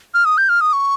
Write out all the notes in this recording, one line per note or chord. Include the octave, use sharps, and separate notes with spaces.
F6
D#6
G6
F6
D#6
C#6